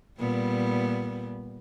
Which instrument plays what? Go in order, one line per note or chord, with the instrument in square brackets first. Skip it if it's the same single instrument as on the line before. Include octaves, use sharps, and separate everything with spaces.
[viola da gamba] A#2 G3 B3